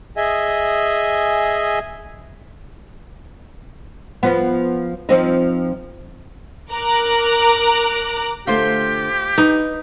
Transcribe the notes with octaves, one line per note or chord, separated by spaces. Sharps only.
G#4 D#5 E5 G#5
F3 B3
F3 C4 D#4
A#4 A#5 D6 F#6
D3 A3 F4 G4 C5
D#4 B4